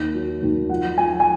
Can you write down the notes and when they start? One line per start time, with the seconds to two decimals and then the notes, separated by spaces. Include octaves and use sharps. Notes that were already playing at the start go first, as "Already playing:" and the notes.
Already playing: D#2
0.14 F#3
0.42 D#2
0.69 F3 F#5
0.98 F3 G#5
1.20 G#5